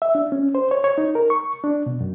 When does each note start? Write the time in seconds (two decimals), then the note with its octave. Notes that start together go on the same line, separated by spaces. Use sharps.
0.02 E5
0.15 D4
0.32 C#4
0.55 C5
0.71 C#5
0.84 C#5
0.98 D#4
1.15 A#4
1.30 C#6
1.64 D4
1.86 B2
2.01 F#2